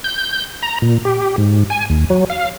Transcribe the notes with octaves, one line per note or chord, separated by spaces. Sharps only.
G6
A#5
A#2
G4
G#2
G#5
D#2
F#3
F5